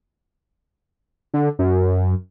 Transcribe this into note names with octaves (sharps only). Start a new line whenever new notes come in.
D3
F#2